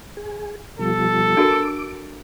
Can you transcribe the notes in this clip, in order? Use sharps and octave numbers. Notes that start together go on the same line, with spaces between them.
G#4
B2 F3 G3 A4
D4 F#4 A#4 D6